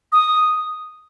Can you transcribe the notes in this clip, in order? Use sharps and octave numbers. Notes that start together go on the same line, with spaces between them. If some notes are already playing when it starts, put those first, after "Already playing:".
D#6